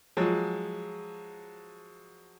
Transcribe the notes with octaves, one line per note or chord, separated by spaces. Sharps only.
F3 F#3 G#3